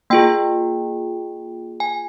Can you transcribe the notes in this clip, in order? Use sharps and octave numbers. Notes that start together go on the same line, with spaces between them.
A#3 F4 G#4 G5
G#5